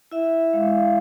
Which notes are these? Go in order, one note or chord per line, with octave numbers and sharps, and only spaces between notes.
E4 E5
G#3 F5